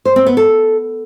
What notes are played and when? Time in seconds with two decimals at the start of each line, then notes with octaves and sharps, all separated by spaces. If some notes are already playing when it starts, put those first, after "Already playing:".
0.05 C5
0.16 C4
0.26 B3
0.37 A4